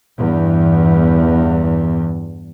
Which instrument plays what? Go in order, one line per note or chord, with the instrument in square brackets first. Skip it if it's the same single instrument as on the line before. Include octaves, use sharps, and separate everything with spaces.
[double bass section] E2 G2